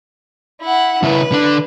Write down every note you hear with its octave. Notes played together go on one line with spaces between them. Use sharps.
E4 F#5
C#3 E4 B4
D3 D4